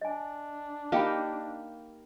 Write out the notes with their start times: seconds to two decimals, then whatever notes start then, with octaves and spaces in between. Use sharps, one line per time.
0.01 D4 D#5 G#5
0.92 A#3 D#4 G4 F5 G5 B5